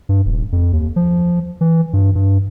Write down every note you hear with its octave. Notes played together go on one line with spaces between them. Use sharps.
G2
D#1
F2
D#2
F3
E3
G2
G2